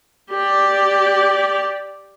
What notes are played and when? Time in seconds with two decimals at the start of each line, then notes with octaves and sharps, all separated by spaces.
0.31 G4 D5